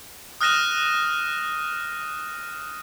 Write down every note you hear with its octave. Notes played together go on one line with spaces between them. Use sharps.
D#6 F6 F#6 A#6 D#7 E7